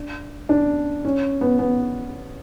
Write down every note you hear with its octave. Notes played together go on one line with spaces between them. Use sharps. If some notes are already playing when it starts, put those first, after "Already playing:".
Already playing: D4
D4
C#4
B3
B3